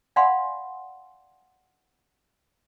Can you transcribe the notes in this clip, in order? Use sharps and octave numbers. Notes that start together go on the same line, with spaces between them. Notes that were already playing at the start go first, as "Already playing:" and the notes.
D5 F5 F#5 G#5 B5 C6